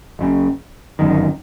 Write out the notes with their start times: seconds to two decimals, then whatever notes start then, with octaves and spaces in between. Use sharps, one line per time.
0.19 F#1 F#2 C#3
0.99 G1 F#2 D#3